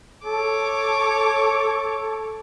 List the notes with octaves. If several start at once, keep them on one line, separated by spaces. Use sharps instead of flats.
A4 C#5 D6